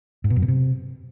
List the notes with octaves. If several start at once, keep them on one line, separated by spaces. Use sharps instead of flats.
G#2
B2
F#2
B2
C3